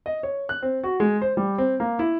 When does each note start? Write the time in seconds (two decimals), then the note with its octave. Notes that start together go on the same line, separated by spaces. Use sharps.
0.06 D#5
0.23 C#5
0.49 F#6
0.62 C4
0.84 F#4
1.00 G#3
1.22 C5
1.37 G3
1.58 C4
1.80 A#3
1.99 E4